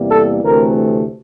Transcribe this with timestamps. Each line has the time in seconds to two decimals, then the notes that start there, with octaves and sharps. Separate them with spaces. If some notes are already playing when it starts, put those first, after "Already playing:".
Already playing: E2 C3 G3 A#3
0.11 A4
0.43 D2 C3 E3 A3 C4 A#4